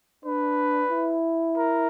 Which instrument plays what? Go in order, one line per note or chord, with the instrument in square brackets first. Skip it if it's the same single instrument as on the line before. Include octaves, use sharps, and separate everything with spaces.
[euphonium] D4 [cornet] B4
[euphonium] E4
[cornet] A#4